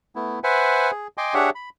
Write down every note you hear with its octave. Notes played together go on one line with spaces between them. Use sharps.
A3 B3 E4
B4 C5 E5 F#5 G#5
G#4
D#5 G5 G#5 C6 D6
D4 G4 G#4 C#5 E5 F#5
B5